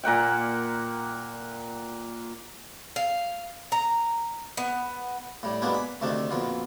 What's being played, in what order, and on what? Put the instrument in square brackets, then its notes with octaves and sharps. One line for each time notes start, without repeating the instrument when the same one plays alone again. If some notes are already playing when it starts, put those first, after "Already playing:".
[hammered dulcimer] A#2 A#3 F#5 G5
[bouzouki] F5
A#5
B3
[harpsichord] A2 G3
F#3 G#3 A#3 B3 D4 G4
B5
D2 C3 D#3 A3 D4
A#1 F2 B2 F4